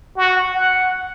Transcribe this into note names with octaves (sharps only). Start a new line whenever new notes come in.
F#4
F#5